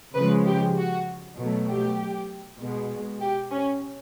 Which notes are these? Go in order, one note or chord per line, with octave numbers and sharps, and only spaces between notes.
C#3 F3 G#3 B4
G4
F#4
B2 F#3 A3
G4
B2 G#3
G4
C#4